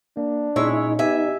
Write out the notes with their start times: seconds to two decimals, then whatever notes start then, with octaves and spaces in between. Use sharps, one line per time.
0.17 A#3 D4
0.56 A#2 G#3 C#4 D#4 E4 C#5
0.99 B3 G4 E5 G#5